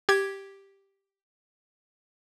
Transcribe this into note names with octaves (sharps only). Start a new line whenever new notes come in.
G4 G#6